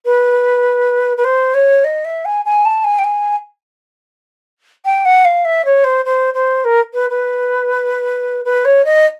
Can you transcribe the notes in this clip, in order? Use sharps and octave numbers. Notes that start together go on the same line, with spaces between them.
B4
B4
C5
C#5
D#5
E5
G#5
G#5
A5
G#5
G5
G#5
G5
F#5
F5
E5
C#5
C5
C5
C5
A#4
B4
B4
B4
C#5
D#5